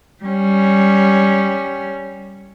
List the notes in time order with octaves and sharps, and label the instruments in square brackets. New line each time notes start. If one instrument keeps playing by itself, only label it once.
[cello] G3 C#4